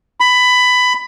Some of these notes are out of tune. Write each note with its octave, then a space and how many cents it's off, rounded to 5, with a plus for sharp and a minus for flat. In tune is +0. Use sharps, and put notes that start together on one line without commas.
B5 +15